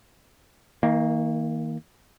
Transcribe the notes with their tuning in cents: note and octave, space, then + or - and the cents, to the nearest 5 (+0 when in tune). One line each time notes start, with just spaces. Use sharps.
D#3 +35 A#3 -5